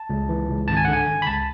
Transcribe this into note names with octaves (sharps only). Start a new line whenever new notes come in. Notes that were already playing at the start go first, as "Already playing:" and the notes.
Already playing: A5
C#2
E3
C#2
G#1 A5
G#5
D3 F#5
G#5
G#1
B5
C#2 A5